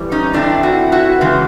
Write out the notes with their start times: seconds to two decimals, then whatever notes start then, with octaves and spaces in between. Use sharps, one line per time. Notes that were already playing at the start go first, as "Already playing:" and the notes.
Already playing: A2 E3 G3 C4
0.11 C#4 D#4
0.33 E3 A3 C4 D4 E4
0.63 E4 F#4
0.92 E4 F#4
1.21 C#3 E3 G#3